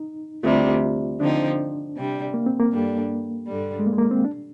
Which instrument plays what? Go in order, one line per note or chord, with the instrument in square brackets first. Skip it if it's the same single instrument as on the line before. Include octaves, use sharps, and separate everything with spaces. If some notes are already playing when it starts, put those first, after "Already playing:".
Already playing: [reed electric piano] D#4
[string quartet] D2 C3 G3 [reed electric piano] F4
[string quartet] D3 F3 C4 D#4 [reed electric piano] D4
[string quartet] C3 G3 D4
[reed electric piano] A#3
C4
A#3
[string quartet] G2 D3 G3 D4
G2 D3 G3
[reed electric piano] G#3
A#3
G#3
A#3
C4
D4